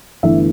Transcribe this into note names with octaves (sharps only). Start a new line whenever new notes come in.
G1 G2 E3 A3 E5